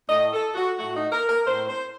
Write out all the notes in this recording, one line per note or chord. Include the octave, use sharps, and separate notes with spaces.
A2 A3 D#5
A4
F#4
A2 A3 F#4
D#4
A#4
A#4
A2 A3 C5
C5